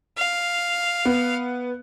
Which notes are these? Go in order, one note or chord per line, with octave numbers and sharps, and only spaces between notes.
F5
B3